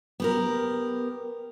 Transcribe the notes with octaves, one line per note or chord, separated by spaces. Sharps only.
B3 G4 A#4